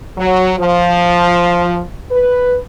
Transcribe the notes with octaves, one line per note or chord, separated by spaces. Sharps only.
F#3
F3
B4